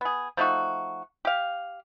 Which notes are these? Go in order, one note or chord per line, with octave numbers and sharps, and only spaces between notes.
B3 G#4
F3 A3 D#4 F#4
G4 F5